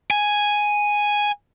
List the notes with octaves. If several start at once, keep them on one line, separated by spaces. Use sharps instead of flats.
G#5